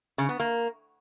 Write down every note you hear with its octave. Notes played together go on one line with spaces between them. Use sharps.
C#3
B3
A#3